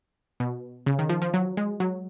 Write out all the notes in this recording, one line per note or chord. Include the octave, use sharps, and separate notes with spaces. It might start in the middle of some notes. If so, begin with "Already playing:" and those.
B2
C#3
D#3
F3
F3
F#3
G#3
F#3